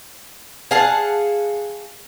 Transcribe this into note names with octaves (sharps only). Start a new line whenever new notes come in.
G#4 F5 F#5 A5